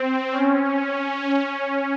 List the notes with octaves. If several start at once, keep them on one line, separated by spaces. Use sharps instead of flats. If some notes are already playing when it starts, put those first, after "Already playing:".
Already playing: C4
C#4